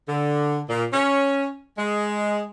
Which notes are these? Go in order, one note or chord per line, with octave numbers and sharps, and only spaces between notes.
D3
A#2
C#4
G#3